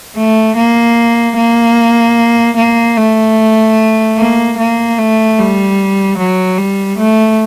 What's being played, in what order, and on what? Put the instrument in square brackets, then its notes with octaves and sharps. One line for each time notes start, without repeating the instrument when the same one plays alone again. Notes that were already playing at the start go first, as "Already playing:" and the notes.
[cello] A3
A#3
A#3
A#3
A3
A#3
A#3
A3
G3
F#3
G3
A3